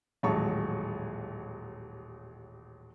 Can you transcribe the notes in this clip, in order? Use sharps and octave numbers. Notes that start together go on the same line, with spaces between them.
D#1 A1 F#3 G#3 A5 C#6